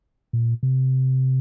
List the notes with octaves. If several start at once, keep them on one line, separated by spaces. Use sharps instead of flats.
A#2
C3